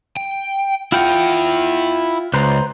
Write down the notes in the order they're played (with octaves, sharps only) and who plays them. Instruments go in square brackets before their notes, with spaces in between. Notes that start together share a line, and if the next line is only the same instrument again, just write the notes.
[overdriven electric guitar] G5
[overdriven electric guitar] E4 F#5 [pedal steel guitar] F4 G5
[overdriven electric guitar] C#2 [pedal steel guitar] B4 C5 A#5